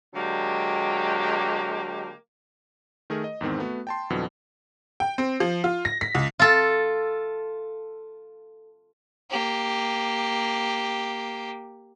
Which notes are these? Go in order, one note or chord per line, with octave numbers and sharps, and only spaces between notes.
D3 F#3 G#3 A#3 G4
D#3 A3 G#4 A#4
D#5
E2 G#2 D#3 C4
A3 B3 F#4
G5 A5 C6
F2 B2 D3 E3 F#3
G5
C4
F3
F4
A#6
B6
C#2
F4 A4
A#3 G4